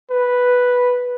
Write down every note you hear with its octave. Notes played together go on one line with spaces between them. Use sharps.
B4